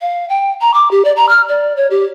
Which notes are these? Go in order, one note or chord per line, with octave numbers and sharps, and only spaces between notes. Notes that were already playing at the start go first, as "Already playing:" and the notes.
F5
G5
A#5
D6
G4
D5
A#5
F6
D5
C#5
G4